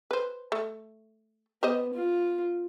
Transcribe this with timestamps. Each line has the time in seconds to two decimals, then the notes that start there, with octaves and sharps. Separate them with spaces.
0.11 B4 C5
0.52 A3
1.63 B3 G4 C5 D#5
1.94 F4